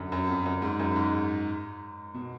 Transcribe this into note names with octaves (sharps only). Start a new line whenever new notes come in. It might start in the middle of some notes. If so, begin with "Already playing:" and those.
Already playing: F#2 D3
F#2
F2
F#2
G#2
F#2
G#2
B2